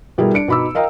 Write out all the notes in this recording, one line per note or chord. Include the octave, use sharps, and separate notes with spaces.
B2 G3 E4 G#4 A#4
D4 C#7 D7
B2 D#4 B5 D6 E6
A#4 D#5 F5 G5 A#5